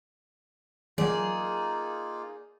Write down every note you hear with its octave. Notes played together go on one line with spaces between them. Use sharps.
E3 F#3 A#3 D#4 F4 G#4 D5